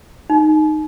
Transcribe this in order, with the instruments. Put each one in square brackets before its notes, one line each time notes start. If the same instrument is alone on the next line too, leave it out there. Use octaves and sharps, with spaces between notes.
[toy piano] D#4